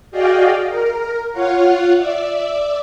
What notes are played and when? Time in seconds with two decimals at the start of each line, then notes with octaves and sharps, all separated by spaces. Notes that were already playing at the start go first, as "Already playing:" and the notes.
0.11 F#4 G#4 D5 D#5 F5 G5
0.67 A#4
1.33 F4 C#5 F5 F#5
1.97 D5 E5